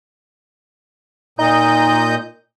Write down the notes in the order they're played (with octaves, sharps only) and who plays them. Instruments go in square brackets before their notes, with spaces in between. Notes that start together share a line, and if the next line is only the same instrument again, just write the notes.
[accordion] A#2 D#5 G6 [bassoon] D#4